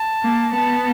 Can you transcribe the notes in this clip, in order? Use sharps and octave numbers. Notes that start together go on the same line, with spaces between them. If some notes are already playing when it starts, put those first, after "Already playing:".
Already playing: A5
A#3
B3 A5